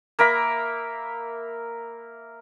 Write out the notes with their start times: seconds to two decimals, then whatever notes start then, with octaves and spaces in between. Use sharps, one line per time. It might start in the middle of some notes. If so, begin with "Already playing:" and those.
0.19 A#3 A#4 E5 B5